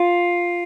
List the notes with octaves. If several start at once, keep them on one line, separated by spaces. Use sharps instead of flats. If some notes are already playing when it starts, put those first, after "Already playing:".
Already playing: F4